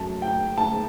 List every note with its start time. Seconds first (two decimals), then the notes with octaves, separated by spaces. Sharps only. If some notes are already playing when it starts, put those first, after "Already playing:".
Already playing: F#2 F#3 A3 A5
0.22 G5
0.58 A5